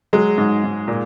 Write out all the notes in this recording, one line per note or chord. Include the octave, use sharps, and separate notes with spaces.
F#3 G#3
G#2
G#2
A#2